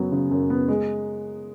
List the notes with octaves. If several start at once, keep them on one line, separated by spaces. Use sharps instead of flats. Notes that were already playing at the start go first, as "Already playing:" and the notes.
Already playing: F#2 C#3 F#3 B3
C#3
F#2
B3
G#3